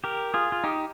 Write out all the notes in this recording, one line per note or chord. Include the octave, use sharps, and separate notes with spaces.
G4 A#4
F4 G#4
F4
D#4 G4